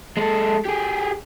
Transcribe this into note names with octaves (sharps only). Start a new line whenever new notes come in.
G#3 A4
G4 G#4